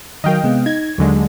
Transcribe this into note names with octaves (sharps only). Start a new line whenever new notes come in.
D#3 F#3 A#4 D#5 F5 G5
C3 G#3 B3
D#4 G#6
D#2 D3 F#3 G#3